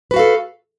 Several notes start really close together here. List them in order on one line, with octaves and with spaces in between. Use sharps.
B4 F#4 F5 A4